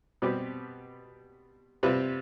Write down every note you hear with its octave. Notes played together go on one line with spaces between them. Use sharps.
B2 G3 C4 G4 B4
C3 G3 C4 F4 B4